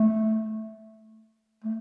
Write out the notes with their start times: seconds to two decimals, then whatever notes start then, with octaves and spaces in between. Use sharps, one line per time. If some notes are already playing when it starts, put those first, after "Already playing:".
Already playing: A3
1.64 A3